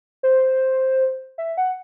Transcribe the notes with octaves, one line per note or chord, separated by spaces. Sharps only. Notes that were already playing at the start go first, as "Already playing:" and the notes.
C5
E5
F#5